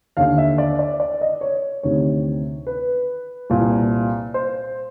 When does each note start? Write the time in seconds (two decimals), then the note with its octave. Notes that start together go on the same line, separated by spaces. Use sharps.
0.17 D#2 D3 F5
0.38 E5
0.58 D5
0.79 D5
1.00 D5
1.21 D#5
1.41 C#5
1.83 D2 C3 D#3 C#5
2.67 B4
3.50 C2 A#2
4.34 C5